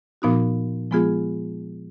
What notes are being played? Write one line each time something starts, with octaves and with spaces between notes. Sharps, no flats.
A#2 F3 B3 D#4 F#4
F3 G#3 B3 F4 G#4